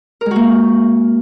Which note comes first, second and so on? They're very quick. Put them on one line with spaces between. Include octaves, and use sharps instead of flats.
A#4 G#3 F#4 A#3